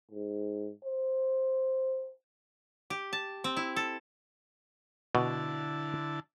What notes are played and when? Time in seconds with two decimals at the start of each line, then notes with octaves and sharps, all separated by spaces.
0.11 G#2
0.84 C5
2.90 G4
3.13 A5
3.44 C4
3.57 E4
3.76 A4
5.15 B2 D3 E4 A5